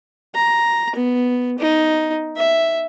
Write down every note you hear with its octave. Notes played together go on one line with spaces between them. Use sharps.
A#5
B3
D#4
E5